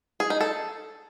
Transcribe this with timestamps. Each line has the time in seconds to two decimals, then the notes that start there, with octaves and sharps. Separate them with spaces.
0.20 G#4
0.30 D#4
0.41 A4